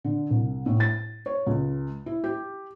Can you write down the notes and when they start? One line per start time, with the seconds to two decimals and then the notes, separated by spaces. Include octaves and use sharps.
0.04 D3
0.31 C2
0.66 A2
0.80 A6
1.26 C#5
1.46 C#2
2.06 E4
2.24 G4